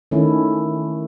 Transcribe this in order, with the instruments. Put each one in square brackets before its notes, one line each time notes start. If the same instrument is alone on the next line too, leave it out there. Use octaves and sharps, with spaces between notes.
[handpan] D#3 A3 C#4 E4